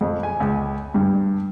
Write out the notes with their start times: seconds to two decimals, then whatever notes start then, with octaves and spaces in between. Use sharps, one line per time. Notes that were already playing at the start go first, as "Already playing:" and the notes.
0.01 F2
0.23 G#5
0.40 C#2
0.94 G2